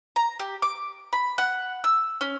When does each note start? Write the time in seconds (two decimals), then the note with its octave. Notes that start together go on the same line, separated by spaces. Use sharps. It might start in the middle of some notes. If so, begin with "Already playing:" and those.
0.16 A#5
0.39 G4
0.62 D6
1.13 B5
1.38 F#5
1.84 E6
2.21 C#4